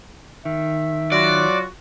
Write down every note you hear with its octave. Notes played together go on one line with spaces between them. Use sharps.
D#3 E5
F#3 F4 F#4 D5